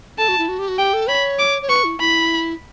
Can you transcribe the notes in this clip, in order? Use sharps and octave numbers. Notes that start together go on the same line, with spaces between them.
A4 A5
F#4
E4
F#4
G4
F#4
G4 G5
A4
C#5 B5
D6
C#5
B4 C#6
E4
E4 B5